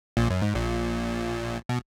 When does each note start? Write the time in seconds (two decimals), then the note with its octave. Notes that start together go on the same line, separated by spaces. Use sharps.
0.17 A#1 A#2
0.30 F#2
0.42 G#2
0.55 A#1 A#2
1.69 B2